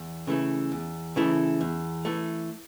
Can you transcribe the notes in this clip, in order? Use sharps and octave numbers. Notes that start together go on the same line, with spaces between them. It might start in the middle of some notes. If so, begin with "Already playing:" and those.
Already playing: E2
C#3 E3 A3 E4
E2
C#3 E3 A3 E4
E2
E3 A3